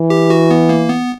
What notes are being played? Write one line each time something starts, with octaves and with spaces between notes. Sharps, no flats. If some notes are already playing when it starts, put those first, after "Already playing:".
Already playing: E3
G4
F#4
B3
A#3
B3